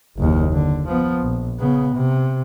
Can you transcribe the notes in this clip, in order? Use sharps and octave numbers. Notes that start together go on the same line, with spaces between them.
F#1 D#2
D3
F3 B3
A#1
C#3 B3
C3